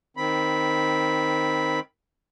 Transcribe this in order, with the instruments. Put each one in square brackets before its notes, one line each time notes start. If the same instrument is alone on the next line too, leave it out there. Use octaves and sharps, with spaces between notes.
[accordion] D#3 C4 B5